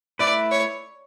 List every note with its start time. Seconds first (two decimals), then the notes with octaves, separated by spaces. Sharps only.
0.19 A3 E4 B4 D5
0.51 C#5